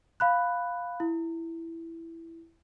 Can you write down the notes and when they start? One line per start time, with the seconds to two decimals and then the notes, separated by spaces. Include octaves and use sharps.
0.20 F5 B5 F#6
1.00 E4